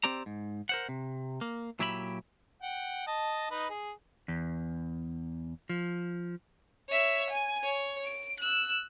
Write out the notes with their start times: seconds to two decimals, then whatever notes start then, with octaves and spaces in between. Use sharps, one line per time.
0.04 C4 G4 D5 A#5
0.26 G#2
0.69 A#4 C5 F#5
0.89 C3
1.41 A#3
1.79 A#2 F#3 E4 G4 E5 B5
2.62 F#5 G5
3.07 D#5 A5
3.51 D#4 B4 D#5
3.69 G#4
4.28 E2
5.69 F3
6.89 C#5 E5
7.30 G#5
7.63 C#5
8.03 D7
8.40 E6 F#6